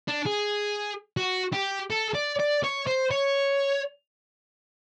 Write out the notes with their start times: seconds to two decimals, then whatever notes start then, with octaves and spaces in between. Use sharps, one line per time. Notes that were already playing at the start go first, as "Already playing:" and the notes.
0.08 D4
0.27 G#4
1.17 F#4
1.53 G4
1.90 A4
2.15 D5
2.39 D5
2.64 C#5
2.87 C5
3.11 C#5